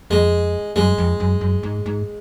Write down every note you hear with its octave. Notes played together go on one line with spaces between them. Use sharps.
F2 G#3
F#2 G#3
F2
F#2
F#2
G#2
G#2